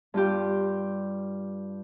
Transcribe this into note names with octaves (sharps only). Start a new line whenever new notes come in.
G2 F4 G4